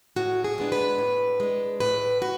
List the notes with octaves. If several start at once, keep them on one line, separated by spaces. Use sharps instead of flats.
A2 F#4
G#4
G#3 B3 D4
B4
A2
G#3 D4
A2 B4
F#4